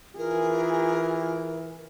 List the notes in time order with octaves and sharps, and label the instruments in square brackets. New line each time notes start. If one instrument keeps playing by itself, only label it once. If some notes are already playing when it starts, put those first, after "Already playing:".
[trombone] E3 [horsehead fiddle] F4 G#4 [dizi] A#4